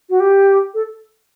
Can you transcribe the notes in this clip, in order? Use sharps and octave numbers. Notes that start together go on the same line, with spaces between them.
F#4
G4
A4